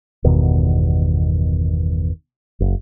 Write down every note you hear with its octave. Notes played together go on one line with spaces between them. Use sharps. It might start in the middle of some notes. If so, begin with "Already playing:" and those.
G1 E2 B2 D#3
F#1